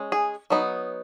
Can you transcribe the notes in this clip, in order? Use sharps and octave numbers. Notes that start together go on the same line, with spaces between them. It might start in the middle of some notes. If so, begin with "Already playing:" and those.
Already playing: G#3 C#4
G#4
F#3 B3 D#4